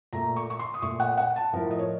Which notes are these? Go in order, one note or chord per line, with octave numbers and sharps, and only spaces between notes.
A#2 A3 A#5
C#6
C#6
C6
D#6
A#2 A3 C#6
F#5
F#5
A5
A2 F3 A3 A#4
D#5
C#5